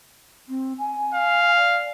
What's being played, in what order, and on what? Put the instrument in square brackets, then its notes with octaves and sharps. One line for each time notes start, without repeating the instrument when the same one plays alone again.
[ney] C4
G#5
[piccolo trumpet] F5
[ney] D5